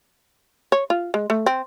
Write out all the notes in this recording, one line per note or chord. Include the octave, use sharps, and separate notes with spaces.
C#5
F4
G#3
A3
C4